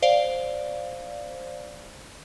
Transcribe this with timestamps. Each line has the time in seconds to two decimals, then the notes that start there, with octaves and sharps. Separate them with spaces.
0.02 C5 D5 F5